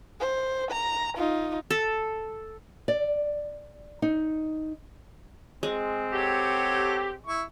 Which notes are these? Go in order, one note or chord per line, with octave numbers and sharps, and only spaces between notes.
C5
A#5
D#4 F4
A4
D5
D#4
G#3 C4
G4 A4 C#5 F#5
E4 C#6